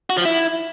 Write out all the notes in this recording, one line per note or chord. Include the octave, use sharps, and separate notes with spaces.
F#4
F3
E4